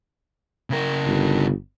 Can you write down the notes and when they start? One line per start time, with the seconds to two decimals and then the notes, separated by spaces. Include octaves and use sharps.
0.70 C#3 A#4
1.06 G1